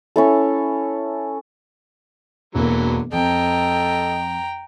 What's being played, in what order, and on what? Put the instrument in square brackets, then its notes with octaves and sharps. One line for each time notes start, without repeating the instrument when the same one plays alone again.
[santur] C#4 E4 A4
[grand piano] E1 A#3 [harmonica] D3 E3 F#3
[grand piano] F2 [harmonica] A4 D#5 [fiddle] G5 A#5